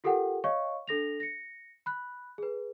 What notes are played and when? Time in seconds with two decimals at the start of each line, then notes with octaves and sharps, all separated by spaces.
0.04 F4 G4 A4 A#4 F#5 G5
0.44 C#5 D#5 F5 C#6
0.87 D4 A4 A#6 F7
1.20 A#6 C#7
1.86 B5 F#6
2.38 G#4 B4